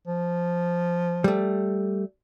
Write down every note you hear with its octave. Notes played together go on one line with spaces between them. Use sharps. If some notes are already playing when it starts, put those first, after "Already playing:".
F3
G3 A3